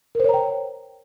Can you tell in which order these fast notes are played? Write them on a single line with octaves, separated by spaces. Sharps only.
A#4 C5 C#5 A#5 G5